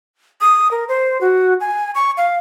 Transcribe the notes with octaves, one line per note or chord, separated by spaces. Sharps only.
D#6
A#4
C5
F#4
G#5
C#6
F5